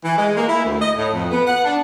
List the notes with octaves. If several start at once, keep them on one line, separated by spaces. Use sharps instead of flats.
E3
G#3
A#3
E4
D2
D#5
A2
F2
B3
F#5
D4